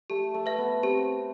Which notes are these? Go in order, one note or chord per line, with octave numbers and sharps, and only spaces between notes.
A3 G4
A3
B4 E5
B3
C4 G4